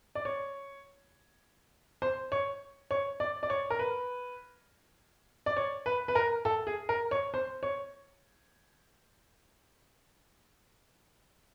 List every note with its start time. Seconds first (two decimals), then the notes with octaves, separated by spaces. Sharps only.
0.15 D5
0.25 C#5
2.02 C5
2.32 C#5
2.91 C#5
3.20 D5
3.43 D5
3.50 C#5
3.70 A#4
3.79 B4
5.46 D5
5.57 C#5
5.86 B4
6.08 B4
6.15 A#4
6.45 A4
6.67 G#4
6.89 A#4
7.11 C#5
7.34 C5
7.63 C#5